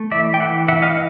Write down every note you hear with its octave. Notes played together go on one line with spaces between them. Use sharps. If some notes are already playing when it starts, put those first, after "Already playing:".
Already playing: A3
E3 D5 E5
G5
E3 E5 F#5
E3 E5 F#5
D#5 F5